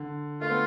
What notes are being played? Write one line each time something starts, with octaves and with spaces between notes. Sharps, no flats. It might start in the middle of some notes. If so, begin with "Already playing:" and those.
Already playing: D3
A3 F4
B3